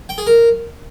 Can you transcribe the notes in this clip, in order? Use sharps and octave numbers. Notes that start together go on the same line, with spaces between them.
G5
G#4
A#4